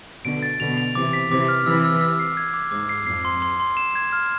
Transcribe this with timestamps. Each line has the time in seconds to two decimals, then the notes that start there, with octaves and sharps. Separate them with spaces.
0.25 B2 D3 D7
0.42 A6
0.60 B2 D3 F7
0.77 F7
0.95 C3 E3 D6
1.13 B6
1.31 C3 E3 D6
1.48 F6
1.66 C3 E3 E6
1.84 E6
2.01 E6
2.19 C7
2.37 G#6
2.54 D6
2.71 G#2 D6
2.89 C7
3.06 F2 C7
3.25 C6
3.42 C6
3.60 C6
3.77 E7
3.95 G#6
4.13 F6